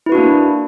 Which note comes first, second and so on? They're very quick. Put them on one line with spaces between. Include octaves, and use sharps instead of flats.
E4 B4 F#4 D4 A#3